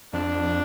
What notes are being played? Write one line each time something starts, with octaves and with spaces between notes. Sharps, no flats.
F2 D4